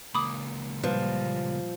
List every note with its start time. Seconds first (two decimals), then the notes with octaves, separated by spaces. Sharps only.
0.15 C#2 A#3 B5 D6 D#6
0.84 A#2 F3 G3 B4